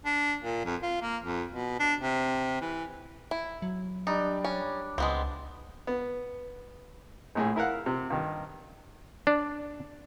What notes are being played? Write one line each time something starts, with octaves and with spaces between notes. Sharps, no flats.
D4
A#2
F2
F4
A#3
F2
B2
D4
C3
E3
E4
F#3
G3 D4 D#4
C#4
C#2 G#3 B3 C4
B3
A#1 A2 G#4
E4 A#4 F5 F#5
C3
G2 D#3
D4